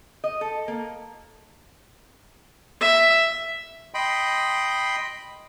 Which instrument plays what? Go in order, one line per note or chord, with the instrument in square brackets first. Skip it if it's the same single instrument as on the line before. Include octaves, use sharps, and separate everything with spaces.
[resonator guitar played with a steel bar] D#5
A4
A#3
[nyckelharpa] E5
[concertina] D#5 G5 B5 C6